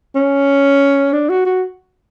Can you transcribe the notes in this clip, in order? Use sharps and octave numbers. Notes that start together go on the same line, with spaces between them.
C#4
D4
F#4
F#4